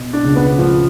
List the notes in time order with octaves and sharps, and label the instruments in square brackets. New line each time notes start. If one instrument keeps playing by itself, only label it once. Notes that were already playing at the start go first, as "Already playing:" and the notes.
Already playing: [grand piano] B2
[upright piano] D4
[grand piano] C#2 C#3
[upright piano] B3
[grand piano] A2 A3 [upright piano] F3